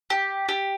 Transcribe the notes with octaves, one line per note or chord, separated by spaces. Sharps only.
G4
G4